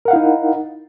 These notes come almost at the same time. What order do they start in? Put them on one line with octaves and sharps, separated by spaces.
A#4 F#5 F5 E4 D#4